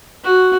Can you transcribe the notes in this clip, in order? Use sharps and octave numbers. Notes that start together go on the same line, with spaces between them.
F#4